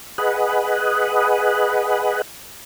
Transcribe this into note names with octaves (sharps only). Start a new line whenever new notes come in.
G#4 B4 D#5 F#5